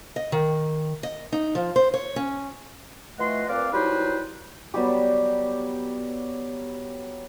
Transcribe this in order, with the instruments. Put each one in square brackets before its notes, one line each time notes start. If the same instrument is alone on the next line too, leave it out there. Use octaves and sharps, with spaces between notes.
[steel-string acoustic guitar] D#5
D#3
D#5
D#4
F3
C5
C#5
C#4
[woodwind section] E3 F3 A3 D#5 F#5 C6
A#2 C4 B4 D5 F5 D6
F#3 G3 D#4 E4 B4 C5
[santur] F#3 G3 B3 G4